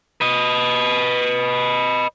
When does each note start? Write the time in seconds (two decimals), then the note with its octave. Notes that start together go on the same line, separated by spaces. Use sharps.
0.21 B4 D#5